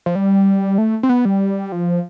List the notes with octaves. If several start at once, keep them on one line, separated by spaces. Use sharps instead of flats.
F3
G3
A3
C4
B3
G3
F3